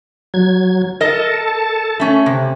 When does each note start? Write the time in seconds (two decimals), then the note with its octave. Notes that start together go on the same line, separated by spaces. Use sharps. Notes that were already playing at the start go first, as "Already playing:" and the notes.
0.34 F#3 G#6
1.01 A4 A#4 D#5 A5
2.00 A3 C#4
2.26 C3